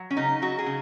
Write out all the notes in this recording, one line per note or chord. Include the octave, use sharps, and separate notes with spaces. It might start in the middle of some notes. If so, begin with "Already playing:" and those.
Already playing: F#3
C#4
C#3 D#4
F#3 F#4
G#4
C#3